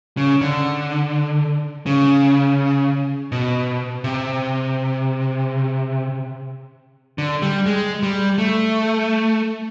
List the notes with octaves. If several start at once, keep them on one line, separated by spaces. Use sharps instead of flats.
C#3
D3
C#3
B2
C3
D3
G3
G#3
G3
A3